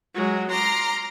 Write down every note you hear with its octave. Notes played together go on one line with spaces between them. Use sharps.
F#3 G#3
A#5 C6 D6 F6